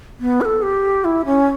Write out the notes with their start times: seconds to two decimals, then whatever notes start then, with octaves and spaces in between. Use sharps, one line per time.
0.20 B3
0.41 B4
0.45 A4
0.62 G4
1.04 E4
1.25 C#4